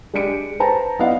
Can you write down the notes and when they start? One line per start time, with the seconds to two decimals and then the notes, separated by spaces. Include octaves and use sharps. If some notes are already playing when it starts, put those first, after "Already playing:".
0.14 G#3 D4 G4 C#7 D7
0.60 B4 C5 A5 A#5
0.99 B3 E4 D5 D#5 F5 F#5